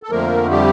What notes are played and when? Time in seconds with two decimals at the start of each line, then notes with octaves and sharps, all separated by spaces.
0.03 A4
0.10 F2 D3 F3 A3 A#3 A#4
0.51 G3 G4